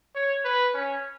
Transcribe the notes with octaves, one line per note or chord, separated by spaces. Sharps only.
C#5
B4
C#4